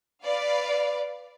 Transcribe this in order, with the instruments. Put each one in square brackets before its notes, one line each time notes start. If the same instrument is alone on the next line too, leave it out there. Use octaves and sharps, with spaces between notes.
[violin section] B4 D5 F5